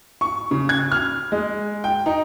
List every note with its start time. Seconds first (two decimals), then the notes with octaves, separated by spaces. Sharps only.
0.21 C#6
0.51 C#3
0.69 G#6
0.92 F6
1.32 G#3
1.84 G5
2.06 D#4